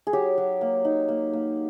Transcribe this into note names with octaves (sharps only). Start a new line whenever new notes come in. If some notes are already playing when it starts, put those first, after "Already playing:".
G#4
F#3 G4
F#3
A#3
D#4
A#3
A#3